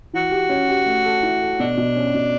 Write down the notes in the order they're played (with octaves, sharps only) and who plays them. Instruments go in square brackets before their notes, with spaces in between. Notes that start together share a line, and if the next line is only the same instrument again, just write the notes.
[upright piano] E3 [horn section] F#4
[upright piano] G4
C#4
G4
A3
A4
E4
A4
[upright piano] B2 [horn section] D4
[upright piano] B2
C#4
B2